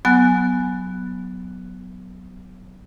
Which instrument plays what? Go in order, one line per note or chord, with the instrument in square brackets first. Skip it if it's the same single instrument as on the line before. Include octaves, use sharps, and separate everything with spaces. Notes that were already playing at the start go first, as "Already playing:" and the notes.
[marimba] F#3 B3 G#5 F#6